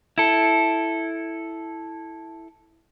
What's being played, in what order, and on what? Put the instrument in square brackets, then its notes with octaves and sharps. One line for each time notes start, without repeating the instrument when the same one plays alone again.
[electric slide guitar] E4 A4